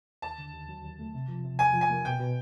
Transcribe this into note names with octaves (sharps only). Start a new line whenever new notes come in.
D#2 A5
D3
D#2
F#3
D#2
A3
C3
F3
C3
E2 G#5
F3
G#5
A#3
B2 G5
B2